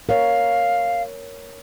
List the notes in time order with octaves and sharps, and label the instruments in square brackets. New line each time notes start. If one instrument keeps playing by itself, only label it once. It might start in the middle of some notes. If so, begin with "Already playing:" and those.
[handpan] A#4 C#5 [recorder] F5